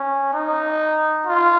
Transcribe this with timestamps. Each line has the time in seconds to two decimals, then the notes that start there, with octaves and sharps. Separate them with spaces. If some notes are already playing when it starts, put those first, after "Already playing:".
Already playing: C#4
0.34 D#4
1.27 F4